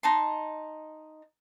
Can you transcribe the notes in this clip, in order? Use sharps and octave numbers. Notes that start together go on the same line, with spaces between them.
D#4 D#5 A5 C6